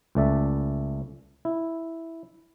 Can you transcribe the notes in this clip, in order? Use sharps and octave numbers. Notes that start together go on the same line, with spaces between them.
C#2 A3 D5 E5
E4